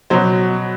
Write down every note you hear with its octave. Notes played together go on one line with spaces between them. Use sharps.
B2 F#3 C5